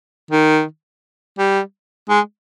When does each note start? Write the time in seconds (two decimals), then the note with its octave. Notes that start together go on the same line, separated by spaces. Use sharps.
0.31 D#3
1.38 G3
2.09 G#3